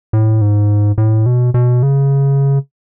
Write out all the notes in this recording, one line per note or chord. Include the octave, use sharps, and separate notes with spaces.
A2
G#2
A2
B2
B2
C#3